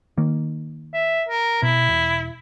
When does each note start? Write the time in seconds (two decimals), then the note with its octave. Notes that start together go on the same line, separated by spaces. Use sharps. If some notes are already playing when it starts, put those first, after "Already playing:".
0.18 D#3 A#3
0.94 E5
1.29 A#4
1.63 B2 E4
1.89 E1